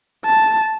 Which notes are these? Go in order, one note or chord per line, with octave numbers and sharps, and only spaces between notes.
A5